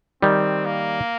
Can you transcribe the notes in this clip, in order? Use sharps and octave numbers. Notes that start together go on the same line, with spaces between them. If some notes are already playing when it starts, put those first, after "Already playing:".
D#3 G3 C4
A#3